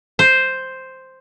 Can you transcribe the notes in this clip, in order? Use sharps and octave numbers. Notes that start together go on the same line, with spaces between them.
C5